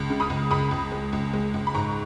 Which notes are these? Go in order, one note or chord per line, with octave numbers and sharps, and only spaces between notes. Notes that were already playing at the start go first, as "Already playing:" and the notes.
Already playing: C#2
C#3
B5 D#6
C#2
C#2 B5 D#6
C#2
G#3
C#2
G#3
C#2
B5
G#2 A#5 C#6